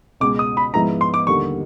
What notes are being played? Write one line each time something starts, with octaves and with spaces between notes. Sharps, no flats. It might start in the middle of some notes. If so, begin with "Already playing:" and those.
C#2 B2 G#3 D6
D#6
B5
G#2 F3 G#3 B3 E4 A#5
C6
D6
D#2 D3 G3 C#6